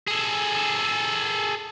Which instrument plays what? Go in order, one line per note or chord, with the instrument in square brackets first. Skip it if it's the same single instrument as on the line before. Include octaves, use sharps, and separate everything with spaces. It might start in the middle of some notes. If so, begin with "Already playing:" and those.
[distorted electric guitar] G#4 A4